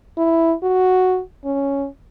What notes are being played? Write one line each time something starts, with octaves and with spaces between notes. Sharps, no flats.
E4
F#4
C#4